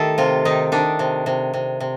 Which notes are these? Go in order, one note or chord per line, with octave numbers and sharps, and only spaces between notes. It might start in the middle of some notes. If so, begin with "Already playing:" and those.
Already playing: D#3 A3 G4 A4
C3 F4
D#3 D#4
D#3 D4
C3
C3
C3
C3